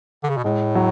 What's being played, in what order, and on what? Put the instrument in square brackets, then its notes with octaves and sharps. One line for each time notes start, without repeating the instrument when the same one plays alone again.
[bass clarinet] D3
C#3
B2
[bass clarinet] A2 [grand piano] G#3
[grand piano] F#3